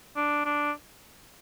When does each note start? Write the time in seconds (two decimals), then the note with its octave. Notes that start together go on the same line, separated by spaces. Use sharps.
0.16 D4
0.45 D4